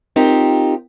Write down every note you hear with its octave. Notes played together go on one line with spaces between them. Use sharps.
C4 D#4 F4 G4 A#4